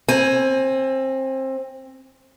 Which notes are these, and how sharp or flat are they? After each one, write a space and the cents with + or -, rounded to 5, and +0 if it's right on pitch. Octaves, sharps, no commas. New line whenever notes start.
C4 +20 G#5 +0